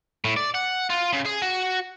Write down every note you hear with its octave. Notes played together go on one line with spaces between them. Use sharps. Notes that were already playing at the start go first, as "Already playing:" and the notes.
A2
D5
F#5
F4
C#3
G#4
F#4